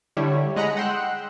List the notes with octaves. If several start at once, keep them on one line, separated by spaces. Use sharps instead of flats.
D3 G3 E4 C#5
G#3 D#5 F#5 A#5 B5 C#7
F#5 G5 C6 E6 F#6